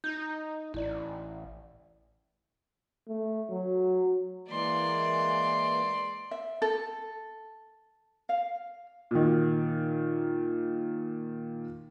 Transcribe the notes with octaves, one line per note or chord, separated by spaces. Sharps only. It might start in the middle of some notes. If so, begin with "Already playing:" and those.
D#4 G6
A1 E4 D5
A3
F#3
E3 G#3 A#3 D5 C6
E5
A4
F5
A#2 D#3